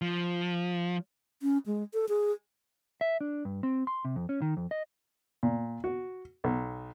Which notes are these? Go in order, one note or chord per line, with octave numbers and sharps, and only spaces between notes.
F3
C#4
G#3
A4
G#4
E5
D4
G2
C4
C6
C3
F2
C#4
D#3
F2
D#5
A#2
F#4
B1